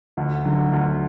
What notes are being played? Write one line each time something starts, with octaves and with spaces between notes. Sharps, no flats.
D2
D3 F#3
D2